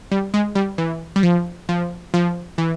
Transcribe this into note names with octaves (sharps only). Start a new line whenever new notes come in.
G3
G#3
G3
E3
G3
F3
F3
F3
E3